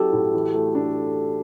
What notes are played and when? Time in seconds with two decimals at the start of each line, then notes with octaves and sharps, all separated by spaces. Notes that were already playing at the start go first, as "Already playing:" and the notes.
Already playing: F#3 C#4 E4 F#4 G4 A4
0.13 A2
0.34 E3
0.54 A3
0.75 D4